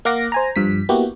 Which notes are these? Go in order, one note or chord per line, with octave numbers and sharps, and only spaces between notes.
A#3 F5 F#5 D6 A#6
C5 G#5 A#5
G2 F3 B6
A#3 B3 E4 F#4 G4